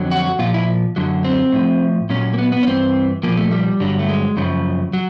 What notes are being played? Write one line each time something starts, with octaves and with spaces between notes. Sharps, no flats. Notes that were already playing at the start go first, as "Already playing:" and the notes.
Already playing: F2 D3 F#3
F#4
A#2 F3 F4
E4
F#2 D3 F#3
C4
A2 F3
A#2 F#3 C#4
A#3
B3
B3
C#4
G2 E3 C4
A#2 F3 A#3
A3
G3
G2 D3 F#3
A3
G#3
F#2 C#3 F3
F#3